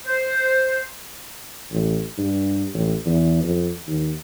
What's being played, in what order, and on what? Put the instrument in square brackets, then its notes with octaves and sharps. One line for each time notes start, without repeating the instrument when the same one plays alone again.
[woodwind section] C5
[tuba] A1
G2
A1
E2
F2
D#2